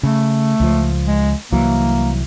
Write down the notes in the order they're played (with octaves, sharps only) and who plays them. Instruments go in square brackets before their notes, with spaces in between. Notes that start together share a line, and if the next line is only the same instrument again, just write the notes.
[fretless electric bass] C#3 [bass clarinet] A3
[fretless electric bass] C#2 F3
[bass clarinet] G#3
[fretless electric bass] C2 E3 F#3 [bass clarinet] A#3